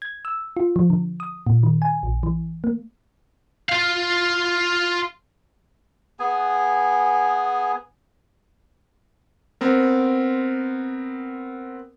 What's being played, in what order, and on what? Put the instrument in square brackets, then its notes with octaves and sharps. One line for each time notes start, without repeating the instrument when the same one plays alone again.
[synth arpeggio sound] G#6
E6
F4
F3
D3
D#6
A#2
D#3
G#5
A#1
E3
A#3
[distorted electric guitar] F4 F5
[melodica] B3 G#4 G#5
[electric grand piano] B3 C4 A#4